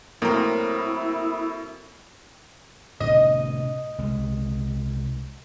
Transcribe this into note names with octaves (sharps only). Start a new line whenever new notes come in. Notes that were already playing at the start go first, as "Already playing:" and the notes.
A2 F#3 A#3 C4 E4 A#4
A2 C3 D4 D#5
C2 G#3